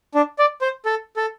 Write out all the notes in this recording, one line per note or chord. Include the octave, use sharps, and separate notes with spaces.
D4
D5
C5
A4
A4